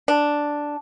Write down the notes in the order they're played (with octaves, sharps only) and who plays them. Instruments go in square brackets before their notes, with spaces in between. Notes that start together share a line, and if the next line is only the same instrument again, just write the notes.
[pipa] D4